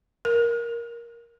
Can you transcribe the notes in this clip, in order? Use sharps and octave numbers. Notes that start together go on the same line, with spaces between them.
A#4